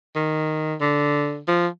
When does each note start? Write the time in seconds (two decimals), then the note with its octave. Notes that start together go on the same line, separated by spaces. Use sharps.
0.15 D#3
0.81 D3
1.47 F3